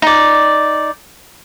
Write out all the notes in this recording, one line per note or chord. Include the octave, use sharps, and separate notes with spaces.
D#4 D5